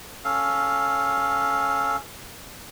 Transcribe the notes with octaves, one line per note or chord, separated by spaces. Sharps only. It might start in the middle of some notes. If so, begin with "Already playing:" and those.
C#4 A4 F5